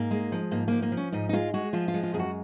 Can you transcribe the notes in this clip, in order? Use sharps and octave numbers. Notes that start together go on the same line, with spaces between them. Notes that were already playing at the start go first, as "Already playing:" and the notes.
Already playing: G#2 A#3
G#3
F3
G#2 A#3
F3 A#3
A#3
F3
C#4
G#2 D#4
D#4
G#3 F4
G#3 F#4
F3 F4
F4
G#3
F4
F#2 G#4
F#4